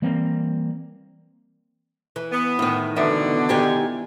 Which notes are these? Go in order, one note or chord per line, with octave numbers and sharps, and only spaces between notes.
E3 G3 A#3 C4
E3
B3
A2 D#3
B2 D3 E3 B3 E5
D#3 G4 G#5